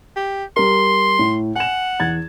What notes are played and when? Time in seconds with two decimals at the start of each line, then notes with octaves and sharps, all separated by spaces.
0.16 G4
0.57 G3 A#4 C6
1.19 A2
1.56 F#5 G#5 E7
2.00 E2 G#6 A6